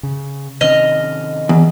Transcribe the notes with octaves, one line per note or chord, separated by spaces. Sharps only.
C#3
C3 D#3 C#4 D#5 F6
E2